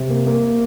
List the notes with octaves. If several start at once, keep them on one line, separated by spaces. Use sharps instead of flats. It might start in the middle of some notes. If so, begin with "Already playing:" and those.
Already playing: C3
A#3
A#3